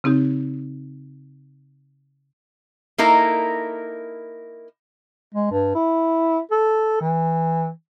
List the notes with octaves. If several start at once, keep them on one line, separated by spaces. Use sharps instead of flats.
C#3 C4 D#4 G4
A#3 D#4 E4 A4 A#4
G#3
G2
E4
A4
E3